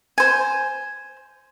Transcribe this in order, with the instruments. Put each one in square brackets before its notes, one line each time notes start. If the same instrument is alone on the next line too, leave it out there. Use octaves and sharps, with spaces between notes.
[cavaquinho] C5 G#5